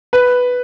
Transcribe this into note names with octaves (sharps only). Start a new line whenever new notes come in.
B4